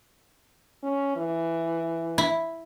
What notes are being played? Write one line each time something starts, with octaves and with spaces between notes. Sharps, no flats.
C#4
E3
E4